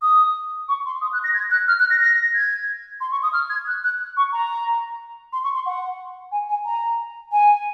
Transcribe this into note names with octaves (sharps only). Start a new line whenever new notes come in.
D#6
C#6
C6
D#6
F#6
A#6
G#6
F#6
F6
F#6
A#6
A#6
G#6
C6
C#6
D#6
F6
G#6
F#6
F#6
C#6
A#5
C6
C#6
C6
F#5
G#5
G#5
A#5
G#5